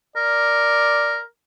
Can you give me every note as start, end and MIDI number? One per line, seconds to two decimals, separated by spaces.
0.16 1.20 70
0.16 1.22 74